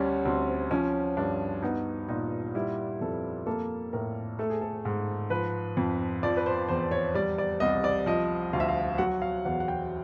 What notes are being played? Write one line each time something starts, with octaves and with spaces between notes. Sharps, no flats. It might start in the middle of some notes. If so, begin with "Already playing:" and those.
Already playing: D2 G3 C#4
D2 C4
F3 C#4
G2 D4
B3 D#4
A#2 D#4
G3 E4
F2 A4
A#3 A4
A2 A#4
A3 A4
G#4
A4
G#2
F3 B4
F2
F3 D5
B4
C5
E2 C5
C#5
G3 D5
D5
C2 D#5
D5
F3 D#5
D2 F5
E5
F5
F#3 F#5
F5
E2 F#5
F#5
G5